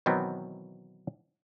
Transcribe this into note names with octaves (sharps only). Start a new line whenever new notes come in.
B2 D#3 E3 F#3 B3 C4